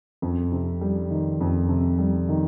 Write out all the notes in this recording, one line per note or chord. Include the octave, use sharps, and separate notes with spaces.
F2
C3
G3
D#3
F2
C3
G3
D#3